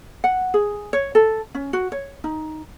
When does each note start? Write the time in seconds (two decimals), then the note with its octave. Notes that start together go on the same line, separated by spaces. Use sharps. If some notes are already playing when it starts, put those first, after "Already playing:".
0.24 F#5
0.54 G#4
0.93 C#5
1.15 A4
1.55 C#4
1.73 F#4
1.92 C#5
2.24 D#4